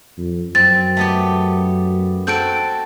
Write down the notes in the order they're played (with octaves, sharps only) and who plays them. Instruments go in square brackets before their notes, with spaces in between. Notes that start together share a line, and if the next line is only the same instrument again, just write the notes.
[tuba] F2
[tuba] F#2 [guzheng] C4 [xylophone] A6
[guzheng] A3 B3 G4
[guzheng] C4 F#4 A4 [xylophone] G6 D7